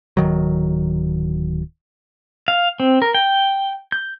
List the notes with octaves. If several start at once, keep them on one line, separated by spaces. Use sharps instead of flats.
D1 D#3 F#3
F5
C4
A#4
G5
G6